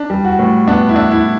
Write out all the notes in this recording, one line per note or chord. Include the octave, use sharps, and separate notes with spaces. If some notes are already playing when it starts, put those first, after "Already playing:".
Already playing: D4
G3
F#4
A2
B3 D4
E4
D4
E4